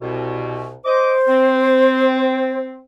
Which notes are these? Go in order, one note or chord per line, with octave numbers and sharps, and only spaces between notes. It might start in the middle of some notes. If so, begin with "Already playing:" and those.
C2 B2
C5 D#5 D6
C4